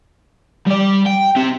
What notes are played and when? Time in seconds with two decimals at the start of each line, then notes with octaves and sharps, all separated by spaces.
0.66 G3 D5
1.06 G5
1.36 C4 G4